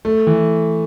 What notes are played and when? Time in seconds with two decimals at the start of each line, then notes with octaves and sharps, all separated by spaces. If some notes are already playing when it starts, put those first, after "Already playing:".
0.05 A3
0.27 E3